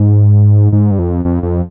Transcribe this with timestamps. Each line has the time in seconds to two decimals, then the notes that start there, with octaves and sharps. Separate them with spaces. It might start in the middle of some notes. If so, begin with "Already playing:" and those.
Already playing: G#2
0.73 G#2
0.91 G2
0.99 F2
1.25 F2
1.43 F2